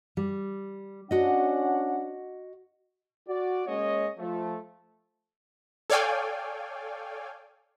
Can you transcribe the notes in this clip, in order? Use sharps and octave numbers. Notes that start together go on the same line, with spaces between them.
G3
C#4 D4 F#4 D#5 F#5
F#4 D5
G#3 A#3 C#4 C#5 D#5
F3 A3
A4 C#5 D5 F5 G5 G#5